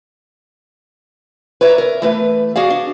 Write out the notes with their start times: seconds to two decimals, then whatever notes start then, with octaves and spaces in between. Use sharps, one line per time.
1.61 B4 C#5 D5 E5 A#5
1.78 A#4
2.02 E3 A3 B4
2.56 F#4 G#4 D5 F5
2.70 D4